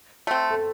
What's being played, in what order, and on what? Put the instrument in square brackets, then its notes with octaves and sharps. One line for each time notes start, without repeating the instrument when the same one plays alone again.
[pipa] A3 C4
[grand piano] A4